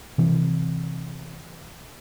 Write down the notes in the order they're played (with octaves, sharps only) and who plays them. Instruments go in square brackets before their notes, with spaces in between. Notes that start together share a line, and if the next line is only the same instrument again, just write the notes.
[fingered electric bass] C3 E3 C4